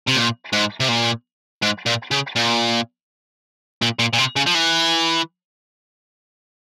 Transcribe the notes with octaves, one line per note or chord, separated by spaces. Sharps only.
C3
A#2
G#2
C3
A#2
G#2
A#2
C#3
A#2
A#2
A#2
A#2
C3
C#3
F3
E3